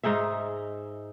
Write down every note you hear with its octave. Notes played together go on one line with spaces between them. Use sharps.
G#2 D#4 G#4 E5